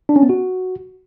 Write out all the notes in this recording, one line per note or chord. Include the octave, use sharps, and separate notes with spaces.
D4
C#4
B3
F#4